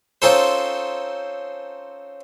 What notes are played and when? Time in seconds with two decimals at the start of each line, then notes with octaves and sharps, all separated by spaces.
0.22 C4 C#4 D#4 F4 A4 C5